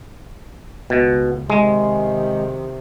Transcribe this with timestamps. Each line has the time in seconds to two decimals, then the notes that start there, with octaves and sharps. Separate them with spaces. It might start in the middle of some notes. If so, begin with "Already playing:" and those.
0.90 C#2 B2
1.50 C3 D#3 G#3